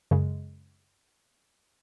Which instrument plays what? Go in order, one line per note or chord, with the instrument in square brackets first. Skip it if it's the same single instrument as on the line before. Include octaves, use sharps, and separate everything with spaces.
[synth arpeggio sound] F#2 C#3 G#3